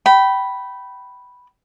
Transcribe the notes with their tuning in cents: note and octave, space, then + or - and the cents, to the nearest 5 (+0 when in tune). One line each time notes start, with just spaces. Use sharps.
G5 -25 B5 +0